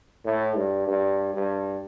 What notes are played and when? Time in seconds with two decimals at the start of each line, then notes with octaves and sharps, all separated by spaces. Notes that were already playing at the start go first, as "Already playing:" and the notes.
0.25 A2
0.56 G2
0.87 G2
1.34 G2